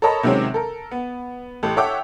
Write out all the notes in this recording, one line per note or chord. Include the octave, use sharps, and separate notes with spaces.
A4 A#4 C#5 D#5 A5 B5
C3 D#3 F#3 G#3 C4 C#4
A4 A#4
B3
A1 G4 A4
A4 C#5 E5 F#5 G5 D6